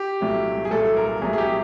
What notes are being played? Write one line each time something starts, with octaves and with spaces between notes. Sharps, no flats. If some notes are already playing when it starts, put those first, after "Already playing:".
Already playing: G4
C2 A#2 F#3 A3
G#4
C2 A#2 F#3 A3 A4
A#4
C2 A#2 F#3 A3 G#4
G#4
G4